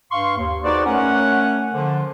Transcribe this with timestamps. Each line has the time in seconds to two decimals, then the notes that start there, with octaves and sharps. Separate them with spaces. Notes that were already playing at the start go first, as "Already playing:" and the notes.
0.12 G2 F5 C6 C#6
0.37 D#2
0.64 D#4 F#4 G#4 B4 C5 D5
0.86 A3 C#4 A#4 C#5 F#5
1.74 D3 F3